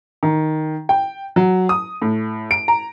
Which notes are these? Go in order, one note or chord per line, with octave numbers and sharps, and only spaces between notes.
D#3
G5
F#3
D#6
A2
D7
A#5